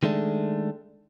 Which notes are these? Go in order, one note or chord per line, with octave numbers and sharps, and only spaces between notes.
D#3 G#3 A3 D4